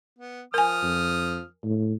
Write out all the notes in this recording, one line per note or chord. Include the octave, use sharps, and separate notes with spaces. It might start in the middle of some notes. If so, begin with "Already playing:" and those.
B3
F3 A#4 G#5 D#6 F6
F2
A2